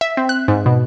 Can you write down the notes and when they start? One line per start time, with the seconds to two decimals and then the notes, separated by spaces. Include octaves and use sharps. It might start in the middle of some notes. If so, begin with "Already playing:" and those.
0.01 E5
0.17 C4
0.29 F#6
0.48 G#2
0.66 B2